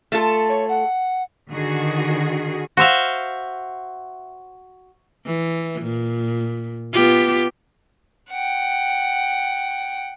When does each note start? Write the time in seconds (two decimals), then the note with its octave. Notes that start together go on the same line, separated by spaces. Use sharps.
0.12 A3 F4 A4
0.49 C#5
0.68 F#5
1.49 D3 D#3 F#4 G#4
2.77 F#4 C5 E5 F5
5.25 E3
5.82 A#2
6.93 B3 F4 G4
8.30 F#5 G5